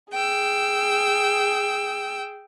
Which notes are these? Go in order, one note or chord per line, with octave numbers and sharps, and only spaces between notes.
G#4 G5 E6